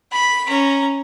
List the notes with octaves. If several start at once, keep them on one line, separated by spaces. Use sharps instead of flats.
B5
C#4 A#5